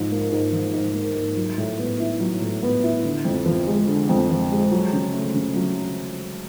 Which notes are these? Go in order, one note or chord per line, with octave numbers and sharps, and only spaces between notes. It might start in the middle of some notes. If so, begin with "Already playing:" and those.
Already playing: G#2 F3
A#3
G#2
F3
G#2
A#3
G#2
F#3
A2
B3
E4
F#3
A2
B3
E4
D3
F2
F3
G#3
D3
F2
F3
G#3
F#3
C#3
A3
C#3
F#3